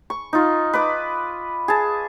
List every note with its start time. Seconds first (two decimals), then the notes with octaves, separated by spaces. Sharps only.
0.10 C#6
0.33 D#4 F4
0.73 B4 D#5 D6
1.68 G#4 A5